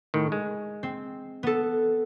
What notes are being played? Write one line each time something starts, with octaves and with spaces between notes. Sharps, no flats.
A2 D#3
G#3
C4
B3 A4